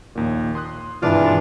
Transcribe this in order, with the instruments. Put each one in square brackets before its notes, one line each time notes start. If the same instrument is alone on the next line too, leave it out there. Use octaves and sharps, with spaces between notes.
[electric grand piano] A#1 D#2 A#2
C6 D#6 F#6
[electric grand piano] G#1 G#3 [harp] G2 B2 [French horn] E3 [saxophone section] D4 F4 D5